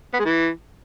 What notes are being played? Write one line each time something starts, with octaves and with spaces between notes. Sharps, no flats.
B3
G#3
E3